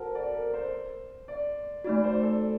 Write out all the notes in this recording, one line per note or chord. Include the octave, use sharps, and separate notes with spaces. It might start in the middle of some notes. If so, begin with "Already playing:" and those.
Already playing: F#4 A4 A#4 C5 F#5 A5
D5
A#4
C5
D5
A3 D#4 F#4 D5
C5
A4